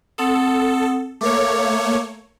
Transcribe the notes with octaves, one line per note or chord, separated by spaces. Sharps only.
C4 A4 F#5 D#6
A3 A#3 C#5 D6